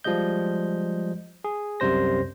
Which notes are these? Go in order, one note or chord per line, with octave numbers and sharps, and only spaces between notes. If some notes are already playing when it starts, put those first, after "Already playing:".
F3 G3 G#3 D#5 G6
G#4
C2 F#2 C3 G3 C5 A#6